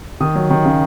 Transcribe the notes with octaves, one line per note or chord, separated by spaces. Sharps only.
D#3 D#6
F#3
D#3
C#3